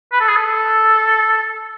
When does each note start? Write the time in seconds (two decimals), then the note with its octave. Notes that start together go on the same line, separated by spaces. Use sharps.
0.13 B4
0.20 A4
0.28 G#4
0.36 A4